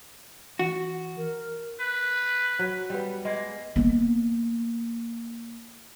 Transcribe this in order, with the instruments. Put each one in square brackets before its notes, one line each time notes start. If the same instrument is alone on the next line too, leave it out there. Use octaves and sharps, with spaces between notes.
[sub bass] E3 [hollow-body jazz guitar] F#4
[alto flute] A#4
[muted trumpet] B4
[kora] F#3
G3 B3
[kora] G#3 [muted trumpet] A#3
[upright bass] A#3 B3